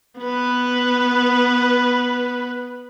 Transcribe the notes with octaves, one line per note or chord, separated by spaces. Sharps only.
B3 B4